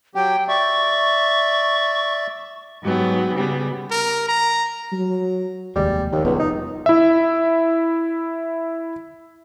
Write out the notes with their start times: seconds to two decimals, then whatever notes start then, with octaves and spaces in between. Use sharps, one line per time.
0.15 F#3 G4 G5
0.48 D5 E5 C#6
2.82 G#2 F#3 B3 G4
3.34 C#3 G3 B3
3.91 A#4
4.29 A#5
4.93 F#3
5.76 F1 D#2 G3 G#3
6.13 D#2 D#3
6.25 F1 C#2 G3 B3
6.39 D#4
6.86 E4 E5